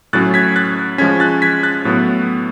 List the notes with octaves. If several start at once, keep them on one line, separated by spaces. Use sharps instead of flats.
A2 F#3 C#4 F#6 A6
G#6 B6
F#6 A6
F3 G#3 C#4 G#6 B6
F#6 A6
G#6 B6
F#6 A6
A2 F#3 B3